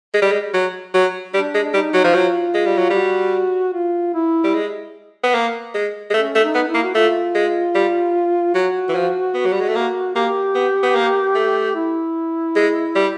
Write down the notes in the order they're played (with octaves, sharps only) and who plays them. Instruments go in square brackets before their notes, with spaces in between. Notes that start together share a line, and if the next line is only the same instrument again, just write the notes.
[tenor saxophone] G#3
G3
G#3
F#3
F#3
[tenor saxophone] G3 [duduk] D4
[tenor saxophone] G#3
[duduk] D4
[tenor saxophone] G3 [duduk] D#4
[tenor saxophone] F#3
F3
[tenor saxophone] F#3 [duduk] F4
[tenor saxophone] G#3
G3
F#3
[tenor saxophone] G3 [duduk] F#4
[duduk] F4
E4
[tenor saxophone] G3
G#3
B3
A#3
G#3
G#3
[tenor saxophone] A3 [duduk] C#4
[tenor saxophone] A3
[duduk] D#4
[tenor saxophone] B3
[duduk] E4
[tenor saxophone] A#3
[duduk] F#4
[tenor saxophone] A3 [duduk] F4
[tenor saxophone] G#3
G3
[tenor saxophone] F#3 [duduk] F#4
[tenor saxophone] E3
F3
B3
F#3
G3
G#3
A3
A#3
[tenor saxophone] A#3 [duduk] G4
[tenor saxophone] B3
B3
A#3
A3
[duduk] E4
[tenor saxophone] G#3
G3